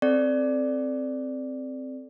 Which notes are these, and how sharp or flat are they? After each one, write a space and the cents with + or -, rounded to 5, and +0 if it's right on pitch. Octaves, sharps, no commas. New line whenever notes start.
C4 +0 A4 -10 D5 +0